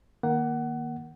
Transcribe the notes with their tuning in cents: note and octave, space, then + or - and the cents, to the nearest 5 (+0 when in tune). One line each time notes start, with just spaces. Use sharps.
D#3 +0 A#3 +15 F#5 +20